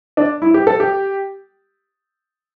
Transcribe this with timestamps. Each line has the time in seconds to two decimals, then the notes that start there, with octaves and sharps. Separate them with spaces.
0.17 D4
0.42 E4
0.54 G4
0.67 A4
0.80 G4